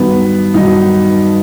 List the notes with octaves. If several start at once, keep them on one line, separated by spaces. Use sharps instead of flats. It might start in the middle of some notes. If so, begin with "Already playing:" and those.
Already playing: G2 D#3 F#3 B3
G2 D#3 F#3 D#4